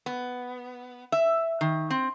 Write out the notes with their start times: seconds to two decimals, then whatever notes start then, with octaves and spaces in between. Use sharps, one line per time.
0.06 B3
1.12 E5
1.61 D#3
1.90 C4